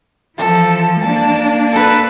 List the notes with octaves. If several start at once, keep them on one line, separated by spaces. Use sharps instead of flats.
E3 F3 A4
A#3 D4 A5
A4 B4